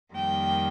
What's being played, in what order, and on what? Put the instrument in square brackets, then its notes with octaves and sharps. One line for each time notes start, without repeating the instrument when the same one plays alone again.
[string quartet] F2 D#3 G3 A#3 G5